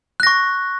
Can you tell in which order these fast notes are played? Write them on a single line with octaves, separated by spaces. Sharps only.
F#6 A#6 C#6